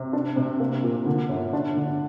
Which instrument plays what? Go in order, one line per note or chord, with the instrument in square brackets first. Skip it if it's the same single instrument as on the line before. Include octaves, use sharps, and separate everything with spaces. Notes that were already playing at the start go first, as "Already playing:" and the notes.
Already playing: [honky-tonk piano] C3
D4
C3
A#3
A#2
D3
G1
D4
D3